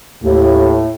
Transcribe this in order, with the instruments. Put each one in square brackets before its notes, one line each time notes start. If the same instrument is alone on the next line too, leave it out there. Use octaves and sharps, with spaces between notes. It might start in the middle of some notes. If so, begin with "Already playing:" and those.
[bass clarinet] D#2 [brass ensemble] A2